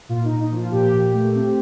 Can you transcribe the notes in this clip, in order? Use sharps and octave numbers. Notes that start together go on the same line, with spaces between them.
A#2 F4
D#4
A#2
D#4
F3
F4
A#2 G4
A#2
A3
C4